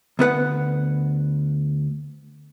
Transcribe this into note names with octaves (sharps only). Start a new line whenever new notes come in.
D2 B3 B4 F#5